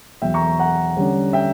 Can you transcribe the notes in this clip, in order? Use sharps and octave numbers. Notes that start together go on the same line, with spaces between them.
E2 B2 F#3 E5 G5
A#5 C#6
F#5 A#5
D3 G3 C#4
E5 G5